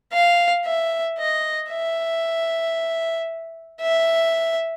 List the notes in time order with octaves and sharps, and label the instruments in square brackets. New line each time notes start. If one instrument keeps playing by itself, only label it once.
[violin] F5
E5
D#5
E5
E5